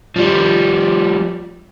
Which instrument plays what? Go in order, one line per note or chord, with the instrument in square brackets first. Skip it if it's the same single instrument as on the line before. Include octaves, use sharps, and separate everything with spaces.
[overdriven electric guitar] F3 G3